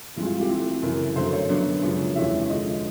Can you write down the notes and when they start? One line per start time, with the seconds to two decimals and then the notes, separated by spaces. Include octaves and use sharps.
0.17 G2 E3 G#3 C4
0.25 F4
0.34 F#4
0.41 G4
0.49 E3 A3 C4 A4
0.82 F#2 C#3 E3 A#4
1.16 F#2 D3 F#3 A3 C5
1.33 C#5
1.49 F#2 D3 F#3 B3 D4
1.82 F#2 C#3 F3 G#3
2.16 E2 C3 E3 G#3 C#4 E5
2.49 D3 F3 G#3 D#5